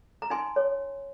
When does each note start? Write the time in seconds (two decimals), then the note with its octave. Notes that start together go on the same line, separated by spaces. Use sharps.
0.22 A#5
0.30 D#4 G#5 C6
0.56 C#5